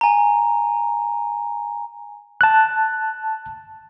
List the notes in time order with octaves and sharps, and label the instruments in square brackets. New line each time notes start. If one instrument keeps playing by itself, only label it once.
[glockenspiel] G#5 A#5
[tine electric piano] A5 F#6